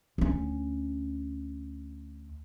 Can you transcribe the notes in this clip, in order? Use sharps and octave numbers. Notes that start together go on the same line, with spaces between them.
D2 C#4